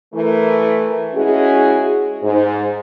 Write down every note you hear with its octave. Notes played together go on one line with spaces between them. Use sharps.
E3 A3 A#4
G#3 C#4 E4 F#4 G#4
G#2